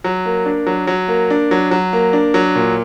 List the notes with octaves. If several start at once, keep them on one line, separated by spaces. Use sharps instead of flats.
F#3
A#3
D4
F#3
F#3
A#3
D4
F#3
F#3
A#3
D4
F#3
A#2